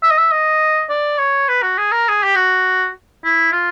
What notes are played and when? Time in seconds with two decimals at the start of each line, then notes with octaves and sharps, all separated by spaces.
0.03 E5
0.10 D#5
0.18 E5
0.31 D#5
0.90 D5
1.19 C#5
1.49 B4
1.63 F#4
1.78 G#4
1.92 A#4
2.09 G#4
2.23 G4
2.36 F#4
3.24 E4
3.52 F4